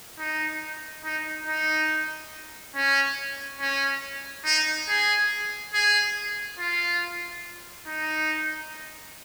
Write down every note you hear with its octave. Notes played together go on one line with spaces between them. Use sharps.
D#4
D#4
D#4
C#4
C#4
D#4
G#4
G#4
F4
D#4